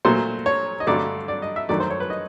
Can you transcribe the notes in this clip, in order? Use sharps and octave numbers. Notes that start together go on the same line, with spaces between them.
A#2 F#3 A3 C5
C#5
D#5
G2 D3 F#3 A3 D5
D5
D#5
E5
F#2 D#3 F#3 A3 D5
C5
C#5
B4
D#5